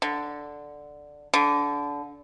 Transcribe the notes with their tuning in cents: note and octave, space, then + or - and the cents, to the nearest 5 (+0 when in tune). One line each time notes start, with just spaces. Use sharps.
D3 +0
D3 -25